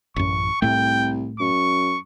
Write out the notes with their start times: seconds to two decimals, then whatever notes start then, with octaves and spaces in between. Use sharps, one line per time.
0.16 A1 F#2 C#6
0.62 C2 A2 A3 G5
1.40 F#2 C#6